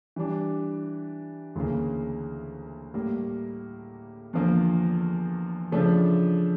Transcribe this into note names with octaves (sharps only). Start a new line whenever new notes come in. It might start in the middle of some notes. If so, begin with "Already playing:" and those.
E3 G3 D4
D2 C#3 E3 A#3
A2 G3 A#3
E2 D3 F3 A#3
C#3 F3 A3 D4